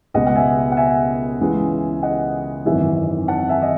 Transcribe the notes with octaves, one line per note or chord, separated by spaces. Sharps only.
C#2 B2 G#3 D#5 F#5
F#5
E5 G#5
F#5
E5 G#5
C#2 C#3 E3 G#3
D#5 F#5
G#1 F#2 E3 E5 G#5
F#5 A5
E5 G#5
D#5